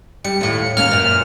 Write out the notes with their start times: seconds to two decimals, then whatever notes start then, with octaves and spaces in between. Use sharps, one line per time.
0.24 G3 C#7
0.41 D#2 A2
0.77 D#2 A#3 C#4 F6
0.91 F#2 A#2